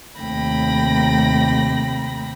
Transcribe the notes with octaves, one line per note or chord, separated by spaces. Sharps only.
D#2 C3 A3 G5 B5 A#6